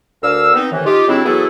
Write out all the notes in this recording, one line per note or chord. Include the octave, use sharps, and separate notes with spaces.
D2 D4 A#4 F5 E6
B3 C4 D#4
A2 C3 D#3 E3
D#4 F4 G4
C#3 F#3 C4 D4 E4
E3 F#3 B3 E4 G#4 A4